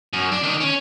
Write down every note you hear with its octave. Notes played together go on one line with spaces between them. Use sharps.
F#2
D4
D#3 D4
C#4